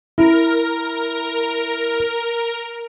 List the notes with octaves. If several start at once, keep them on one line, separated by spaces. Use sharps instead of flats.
E4 A#4